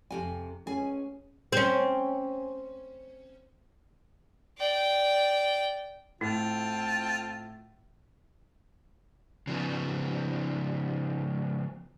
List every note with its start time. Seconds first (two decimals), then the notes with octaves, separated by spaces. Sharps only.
0.11 F2 C3 G#5
0.67 C#4 G#4 G#5
1.52 C4 C#4
4.58 D5 G5
6.21 A2 C4 E4 F4 A5
9.47 C#3 F3 B3